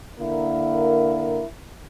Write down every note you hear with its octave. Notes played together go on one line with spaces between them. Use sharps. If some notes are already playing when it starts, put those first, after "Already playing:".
D3 A#3 E4 A#4